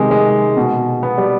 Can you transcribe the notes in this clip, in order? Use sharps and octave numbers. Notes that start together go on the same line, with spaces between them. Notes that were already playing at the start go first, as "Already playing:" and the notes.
Already playing: C3 D#3 G#3
G#3
B2
B3
G3